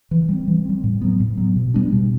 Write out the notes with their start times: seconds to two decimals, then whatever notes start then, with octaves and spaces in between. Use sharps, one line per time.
0.11 E3
0.29 G3 C4
0.47 E3
0.65 G3 C4
0.84 A2
1.01 F#3 B3
1.20 A2
1.38 F#3 B3
1.56 B2
1.74 G3 B3 D4
1.93 B2